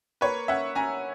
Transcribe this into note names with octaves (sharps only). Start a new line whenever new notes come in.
A#3 B4 C#5
C#4 E5 F#5
C#4 G#5 A#5